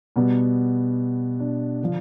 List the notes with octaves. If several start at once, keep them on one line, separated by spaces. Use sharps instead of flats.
B2 G3 B3
D4
D3 F3